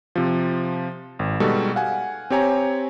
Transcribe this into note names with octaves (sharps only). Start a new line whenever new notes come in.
C3 F3
G#1
B2 G3 G#3 D#4 F#4 A4
F5 F#5 G#5
C4 G4 C#5 G#5 A#5